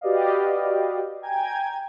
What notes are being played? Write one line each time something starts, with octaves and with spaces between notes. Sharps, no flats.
F#4 G4 B4 D5 D#5 F5
G5 G#5 A#5 G#6